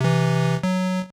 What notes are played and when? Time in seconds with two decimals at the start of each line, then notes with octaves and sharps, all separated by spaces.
0.01 C3 E3
0.63 F#3